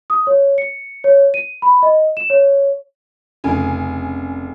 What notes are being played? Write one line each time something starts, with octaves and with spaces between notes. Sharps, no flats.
D#6
C#5
C#7
C#5
D#7
B5
D#5
E7
C#5
F1 C#3 G#5